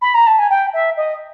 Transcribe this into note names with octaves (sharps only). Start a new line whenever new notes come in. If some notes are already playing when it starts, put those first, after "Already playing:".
B5
A#5
A5
G#5
G5
E5
D#5